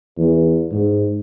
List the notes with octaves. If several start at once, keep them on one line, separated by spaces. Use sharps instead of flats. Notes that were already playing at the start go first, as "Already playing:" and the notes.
E2
G#2